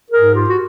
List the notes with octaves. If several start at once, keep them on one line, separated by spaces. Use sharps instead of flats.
G#4 A#4
G#2
F4 G4
F#4